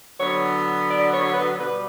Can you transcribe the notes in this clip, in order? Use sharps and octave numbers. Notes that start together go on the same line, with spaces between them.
D3 F#3 B3 C#5
D5
C#5
B4
B2 G3 B3 B4